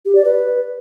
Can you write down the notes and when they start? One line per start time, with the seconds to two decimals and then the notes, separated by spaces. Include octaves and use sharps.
0.05 G4
0.15 D5
0.25 B4